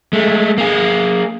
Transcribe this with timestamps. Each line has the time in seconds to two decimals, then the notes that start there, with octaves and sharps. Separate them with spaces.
0.13 G#3 A3
0.58 A#3 G#4